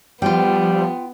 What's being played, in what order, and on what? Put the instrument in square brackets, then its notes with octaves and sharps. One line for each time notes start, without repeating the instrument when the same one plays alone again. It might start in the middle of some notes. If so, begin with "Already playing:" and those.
[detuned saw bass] F3 [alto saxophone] G3 [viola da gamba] B3 [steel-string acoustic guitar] F4 G5